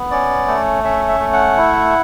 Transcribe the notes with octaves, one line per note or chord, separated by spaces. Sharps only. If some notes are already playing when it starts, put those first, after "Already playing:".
Already playing: B3
C#4 D5
A3
C#4 E5
E5
A3
F#5
E4